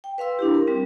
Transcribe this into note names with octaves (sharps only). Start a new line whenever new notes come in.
G5
B4 F5 C6 E6
D4 E4 G4
A#4
G3 C4